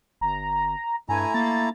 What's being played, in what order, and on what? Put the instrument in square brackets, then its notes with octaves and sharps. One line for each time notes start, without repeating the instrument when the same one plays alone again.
[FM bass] G1 [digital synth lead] A#5
[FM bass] G2 [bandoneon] A3 E4 A#5 [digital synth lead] G#5
[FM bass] A#3 [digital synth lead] A6